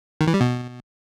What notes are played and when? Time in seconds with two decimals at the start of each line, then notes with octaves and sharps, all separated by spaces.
0.21 D#3
0.27 E3
0.34 G3
0.41 B2